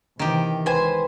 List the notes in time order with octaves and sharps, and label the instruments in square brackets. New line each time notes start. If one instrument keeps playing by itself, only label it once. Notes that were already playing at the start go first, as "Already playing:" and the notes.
[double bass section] D#2 C3 E3 [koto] D#3 G4
[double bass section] C#2 [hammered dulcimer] B4 [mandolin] C5 G#5